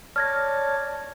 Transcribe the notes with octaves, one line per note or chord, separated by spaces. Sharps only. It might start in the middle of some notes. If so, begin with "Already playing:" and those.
C#5 D5 A5 F6 G#6 A#6